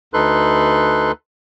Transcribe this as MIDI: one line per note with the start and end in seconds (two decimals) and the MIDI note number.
0.14 1.12 38
0.14 1.12 63
0.14 1.12 69
0.14 1.12 71
0.14 1.12 84
0.14 1.12 90